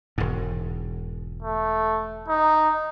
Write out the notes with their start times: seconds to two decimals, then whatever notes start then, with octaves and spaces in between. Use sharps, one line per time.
0.18 E1 G#2
1.42 A3
2.29 D#4